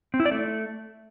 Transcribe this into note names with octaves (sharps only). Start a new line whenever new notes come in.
C4
E4
D5
A3